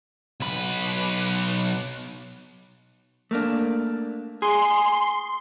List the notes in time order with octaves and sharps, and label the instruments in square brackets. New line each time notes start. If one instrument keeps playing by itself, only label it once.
[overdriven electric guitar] B1 B4
[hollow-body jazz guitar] A3 A#3 D4
[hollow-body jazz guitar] G#4 [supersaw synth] C6